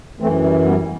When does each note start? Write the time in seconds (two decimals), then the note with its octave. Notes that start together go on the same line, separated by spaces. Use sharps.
0.20 F#2 E3 A3 C4
0.44 G3
0.66 G3 B3